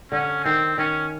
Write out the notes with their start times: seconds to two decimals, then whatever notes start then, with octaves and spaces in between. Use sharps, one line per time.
0.12 D3 C#4
0.44 D#3 C4
0.78 D#3 C#4